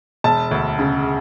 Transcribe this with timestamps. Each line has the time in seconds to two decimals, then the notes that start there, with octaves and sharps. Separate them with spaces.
0.24 E1 A5
0.51 D2
0.79 C#3